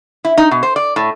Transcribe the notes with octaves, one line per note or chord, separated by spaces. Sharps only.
E4
D#4
B2
C5
D5
A2